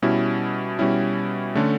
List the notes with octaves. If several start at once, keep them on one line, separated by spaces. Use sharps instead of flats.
B2 G3 C#4 E4
B2 G3 C#4 E4
D3 A3 C#4